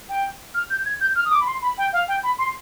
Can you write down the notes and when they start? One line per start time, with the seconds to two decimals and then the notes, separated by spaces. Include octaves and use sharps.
0.09 G5
0.54 F6
0.70 G6
0.86 G#6
1.01 G6
1.16 F6
1.25 D#6
1.32 D6
1.41 B5
1.47 C6
1.62 B5
1.78 G5
1.93 F5
2.08 G5
2.23 B5
2.39 C6